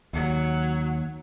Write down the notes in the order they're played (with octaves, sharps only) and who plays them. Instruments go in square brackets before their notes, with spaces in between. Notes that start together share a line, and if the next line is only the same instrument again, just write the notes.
[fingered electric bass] D#2 [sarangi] F#3